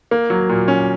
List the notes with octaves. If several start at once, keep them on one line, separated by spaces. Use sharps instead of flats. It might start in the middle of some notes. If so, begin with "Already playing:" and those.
A#3
F#3
A#2
C#4